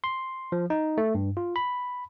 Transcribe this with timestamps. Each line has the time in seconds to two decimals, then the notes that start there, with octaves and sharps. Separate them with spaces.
0.04 C6
0.52 F3
0.70 D#4
0.98 A3
1.15 G2
1.37 F4
1.56 B5